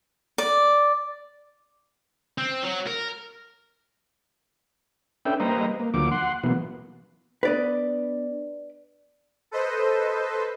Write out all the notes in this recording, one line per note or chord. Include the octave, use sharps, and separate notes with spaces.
D5
C4
F#3
A#4
C#4 D4 A4 B4 E5 G5
G3 A#3 B4 C5 D#5 A#5
A#3
D2 F3 F#3 A#3 D6
F#5 C6
B2 E3 F#3 A#3 B3
B3 D4 B4 D5 D#5
A4 B4 C5 D#5